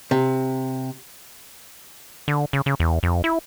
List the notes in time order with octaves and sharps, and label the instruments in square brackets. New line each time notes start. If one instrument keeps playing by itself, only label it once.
[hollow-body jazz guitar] C3
[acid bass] D3
C#3
C#3
E2
F2
E4